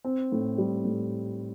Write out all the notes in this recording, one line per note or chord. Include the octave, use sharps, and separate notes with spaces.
C4
A2
G3
A2